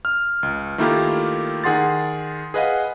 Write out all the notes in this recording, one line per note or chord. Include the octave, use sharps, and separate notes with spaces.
F6
C#2
D#3 A3 A#3 E4 F4 G4
D#3 G#4 F#5 C6 A6
G#4 B4 D#5 F5 F#5